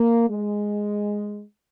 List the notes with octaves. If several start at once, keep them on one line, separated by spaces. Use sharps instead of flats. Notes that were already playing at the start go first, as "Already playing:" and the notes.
Already playing: A#3
G#3